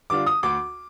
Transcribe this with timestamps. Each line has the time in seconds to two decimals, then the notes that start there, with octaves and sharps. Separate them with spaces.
0.10 D3 G3 D4 F4 D6
0.26 D#6
0.43 D2 D6